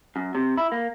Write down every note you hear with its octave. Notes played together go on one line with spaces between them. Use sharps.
F#2
C3
E4
A#3